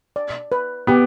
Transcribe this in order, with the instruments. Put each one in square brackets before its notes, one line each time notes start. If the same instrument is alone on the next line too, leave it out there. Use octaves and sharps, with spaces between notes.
[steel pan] D5
B4
[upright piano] B3 [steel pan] G4